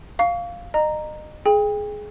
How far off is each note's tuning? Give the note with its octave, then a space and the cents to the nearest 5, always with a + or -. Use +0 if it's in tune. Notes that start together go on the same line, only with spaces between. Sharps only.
F5 +0 C#6 +40
D#5 -30 A#5 +0
G#4 +20 G5 +35